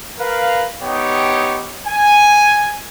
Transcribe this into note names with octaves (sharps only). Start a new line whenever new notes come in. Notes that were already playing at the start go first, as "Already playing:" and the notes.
A#4 B4 F5
B3 D#4 G4 C#5 G5
G#5